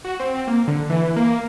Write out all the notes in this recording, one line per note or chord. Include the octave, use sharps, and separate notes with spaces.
F#4
C4
A#3
D3
E3
A#3